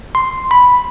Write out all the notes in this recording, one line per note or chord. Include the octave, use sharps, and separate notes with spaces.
C6
B5